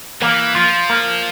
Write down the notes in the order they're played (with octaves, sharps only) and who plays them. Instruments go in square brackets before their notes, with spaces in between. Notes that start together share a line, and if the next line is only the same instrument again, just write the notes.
[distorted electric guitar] E3 [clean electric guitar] A#3
[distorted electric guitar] F3 [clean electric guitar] F4
[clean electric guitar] A#3